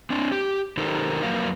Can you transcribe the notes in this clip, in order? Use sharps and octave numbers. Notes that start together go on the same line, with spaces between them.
C4 D4
G4
D#3 D#4 G4 A4 A#4 C5
F2 F#3 A#3 A#4 B4 F5